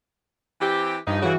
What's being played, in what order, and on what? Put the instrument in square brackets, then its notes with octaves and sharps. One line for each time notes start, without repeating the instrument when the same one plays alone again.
[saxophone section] E3 C4 G4
[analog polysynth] G2 [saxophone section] D#3 F3 D#4
[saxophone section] C#3 [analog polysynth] E3 F#4